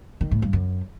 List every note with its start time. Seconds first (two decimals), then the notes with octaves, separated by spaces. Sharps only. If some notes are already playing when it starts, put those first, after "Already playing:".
0.21 D#3
0.31 A2
0.42 G2
0.53 F#2